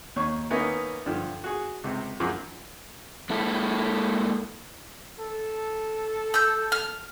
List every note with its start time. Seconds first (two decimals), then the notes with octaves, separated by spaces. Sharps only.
0.16 D#2 C#5 C#6
0.50 D#3 A#3 B3 C#4 D#4 E4
1.06 G2 D3 F3
1.44 F#4 G#4
1.84 C#2 C3
2.20 F#2 F3 D#4 G#4 D6
3.30 G#3 A#3 E4 A4
5.20 A4
6.34 E6 G6
6.72 F6